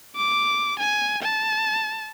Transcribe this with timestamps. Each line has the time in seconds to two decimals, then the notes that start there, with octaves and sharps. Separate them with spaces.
0.16 D6
0.79 G#5
1.23 A5